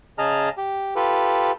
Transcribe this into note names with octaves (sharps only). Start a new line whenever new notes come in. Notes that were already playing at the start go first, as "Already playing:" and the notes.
C#3 G#4 D#5 A5 A#5 F6
G4
F4 G4 A4 B4